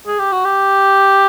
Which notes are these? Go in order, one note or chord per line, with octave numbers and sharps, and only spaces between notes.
G#4
G4
F#4
G4